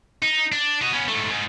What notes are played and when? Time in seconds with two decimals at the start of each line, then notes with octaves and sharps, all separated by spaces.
0.22 D#4
0.52 D4
0.81 F#4 D#5
0.92 B3 C#4
1.08 G#2 A3
1.30 G#2